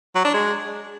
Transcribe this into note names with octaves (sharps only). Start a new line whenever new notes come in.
F#3
D4
G#3